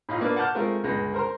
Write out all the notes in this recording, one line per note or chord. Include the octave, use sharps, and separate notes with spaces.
A2 D#4 F4
A#3 D4 F4 B4
F#5 A5 D6 F6 G6
G#3 A3 C4 F4 A#4
G1 C#2 G#3 A#6
A#4 C5 A#5 C6